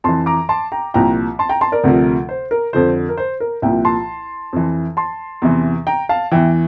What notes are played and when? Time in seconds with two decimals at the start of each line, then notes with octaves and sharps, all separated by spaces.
0.04 F2 E3 A5 C6
0.26 A#5 D6
0.49 A5 C6
0.72 G5 A#5
0.94 C2 A#2 F3 G5 A#5
1.39 A5 C6
1.49 G5 A#5
1.61 A5 C6
1.72 A#4 D5
1.84 D2 C3 F3
2.29 C5
2.51 A#4
2.73 F2 D3 F3 C5
3.09 A#4
3.17 C5
3.40 A#4
3.62 C2 A#2 F3 E5 G5
3.85 A5 C6
4.53 F2 E3
4.97 A5 C6
5.42 E2 C3 E3
5.87 G5 A#5
6.09 F5 A5
6.32 E2 E3 E5 G5